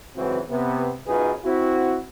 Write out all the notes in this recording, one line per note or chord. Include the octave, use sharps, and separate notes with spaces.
C#2 F#2 E3 C4 F#4 B4
C3 B3
B1 F#2 D#4 F4 G#4 B4
C4 E4 F#4